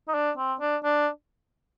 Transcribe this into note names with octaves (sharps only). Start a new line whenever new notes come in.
D#4
D4
C4
D4
D4